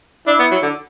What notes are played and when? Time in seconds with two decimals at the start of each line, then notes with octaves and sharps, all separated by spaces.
0.27 D4 E4
0.39 B3
0.52 F#3
0.63 D3